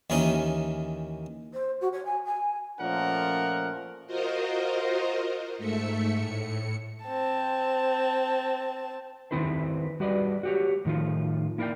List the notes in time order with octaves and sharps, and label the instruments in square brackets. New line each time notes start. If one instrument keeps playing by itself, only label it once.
[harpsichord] D#2 D#3 E3 C#4 D#4
[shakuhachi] C5
F#4
C#5
G#5
G#5
[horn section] A#2 F3 A3 C#4 A#4 F#5
[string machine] F4 F#4 A#4 C5 D#5
G#2 A3 E5 C#7
A2 C#7
[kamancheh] C4 A5
[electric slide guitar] D#3 G#3 C4 E4 B4 C5
G3 F#4 B4 D5 D#5
F#4 G4 C#5
A2 D#3 F3 F4
A#3 E4 A#4 D5 F5 G5